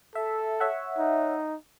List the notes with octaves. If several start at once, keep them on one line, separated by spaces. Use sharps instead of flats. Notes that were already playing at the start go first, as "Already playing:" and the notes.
A4 E5
C#5 E5 F#5
D#4